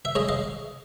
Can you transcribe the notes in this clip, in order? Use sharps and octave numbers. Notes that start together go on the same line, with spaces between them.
E5
G#3 C#5 D#5
D#5 F5